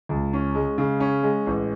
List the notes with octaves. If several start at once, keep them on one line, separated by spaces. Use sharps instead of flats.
C#2
C#4
G#3
C#3
C#4
G#3
A1